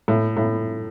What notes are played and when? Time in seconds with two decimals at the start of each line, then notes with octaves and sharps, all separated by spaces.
0.08 A2
0.37 A2